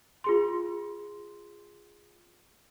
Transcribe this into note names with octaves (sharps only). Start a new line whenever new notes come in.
F4 G#4 C6